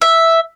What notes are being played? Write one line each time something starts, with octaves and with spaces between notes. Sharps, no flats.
E5